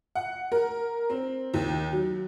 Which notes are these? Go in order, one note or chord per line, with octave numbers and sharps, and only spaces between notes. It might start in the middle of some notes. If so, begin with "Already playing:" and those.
F#5
A#4
C4
D#2
F#3